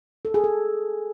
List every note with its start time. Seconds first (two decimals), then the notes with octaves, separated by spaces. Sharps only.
0.25 A4
0.34 G#4
0.44 A4